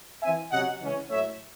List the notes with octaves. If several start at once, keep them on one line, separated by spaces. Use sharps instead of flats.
E3 C4 E5 G#5
C3 F#3 C#4 D#5 F#5
C#3 E3 G#3 C#4
A2 F#3 A3 C#5 E5